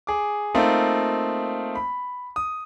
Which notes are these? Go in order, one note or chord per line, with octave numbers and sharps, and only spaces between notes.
G#4 D6
A3 A#3 C4 D#4 F4
B5
D#6